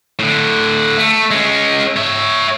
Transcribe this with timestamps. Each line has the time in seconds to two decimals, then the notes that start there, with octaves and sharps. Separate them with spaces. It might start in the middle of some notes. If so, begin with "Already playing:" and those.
0.19 A2 D3
0.97 A3
1.31 G#3 C#4
1.96 C#5 E5